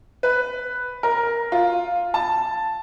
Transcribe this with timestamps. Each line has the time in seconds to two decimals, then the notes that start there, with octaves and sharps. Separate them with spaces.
0.23 B4
1.03 A#4
1.52 F4
2.14 A5